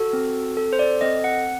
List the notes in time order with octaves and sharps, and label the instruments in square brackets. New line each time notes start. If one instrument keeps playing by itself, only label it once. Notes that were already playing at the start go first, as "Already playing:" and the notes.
Already playing: [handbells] F#4 A4
C4
A4
C5
D5
C4 D#5
F#5